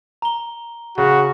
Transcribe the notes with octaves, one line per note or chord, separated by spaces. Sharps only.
A#5 G7
C#3 F#4